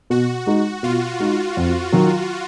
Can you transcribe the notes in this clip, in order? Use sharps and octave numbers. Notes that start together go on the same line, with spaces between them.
B2 F#4
G#3 D#4 F#4
B2 F4
G#3 D#4 F#4
F2
D#3 F#3